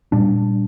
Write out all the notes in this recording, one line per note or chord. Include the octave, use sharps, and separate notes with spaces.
A#2 G3 D4